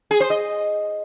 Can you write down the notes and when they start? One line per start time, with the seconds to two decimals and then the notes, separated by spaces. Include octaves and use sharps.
0.11 G#4
0.20 C5
0.30 D#5